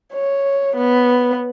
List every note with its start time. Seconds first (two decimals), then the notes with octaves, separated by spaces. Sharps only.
0.13 C#5
0.76 B3